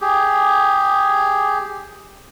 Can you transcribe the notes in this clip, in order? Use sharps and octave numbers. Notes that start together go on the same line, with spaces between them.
G4 G#4